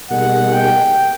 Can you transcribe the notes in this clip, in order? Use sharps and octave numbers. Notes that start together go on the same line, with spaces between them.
B2 G3 A#3 D#4 G#4 F#5
G5